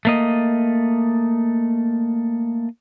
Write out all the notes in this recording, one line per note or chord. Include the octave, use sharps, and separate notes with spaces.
A3 A#3 D#5